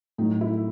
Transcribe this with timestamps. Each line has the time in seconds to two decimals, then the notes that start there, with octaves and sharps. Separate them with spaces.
0.18 A2 F#3 A3 D#4
0.41 E4